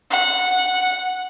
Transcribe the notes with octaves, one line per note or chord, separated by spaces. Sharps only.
F#5